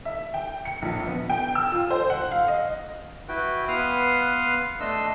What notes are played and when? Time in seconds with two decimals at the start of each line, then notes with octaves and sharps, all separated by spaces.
0.05 E5
0.34 G5
0.65 C#7
0.82 A#1
1.07 B3
1.30 G5
1.55 E6
1.72 F4
1.91 C5
2.10 F#5
2.31 F5
2.48 D#5
3.29 E4 F#4 B4 G5
3.68 B3 B4 F5 C6 D#6 F6
4.80 A3 D4 D#5 C6 E6